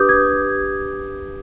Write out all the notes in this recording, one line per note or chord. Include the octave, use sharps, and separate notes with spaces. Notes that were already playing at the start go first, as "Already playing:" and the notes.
Already playing: D4 G4 B4 D6 D#6 G6
G#6